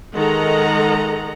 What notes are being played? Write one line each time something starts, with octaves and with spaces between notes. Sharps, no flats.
D#3 G#3 A4 D#5 F#5 A#5